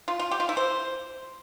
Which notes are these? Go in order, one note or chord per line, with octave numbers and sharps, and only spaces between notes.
F4
F4
G4
F4
E4
C5